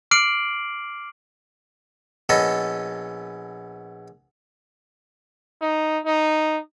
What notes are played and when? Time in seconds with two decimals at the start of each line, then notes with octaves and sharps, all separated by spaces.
0.11 D6 F6 C7 D7 F#7
2.29 A#1 B3 C#4 A4 D#5
5.61 D#4
6.05 D#4